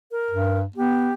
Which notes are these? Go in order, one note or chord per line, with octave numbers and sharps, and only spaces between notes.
A#4
G2
B3 G4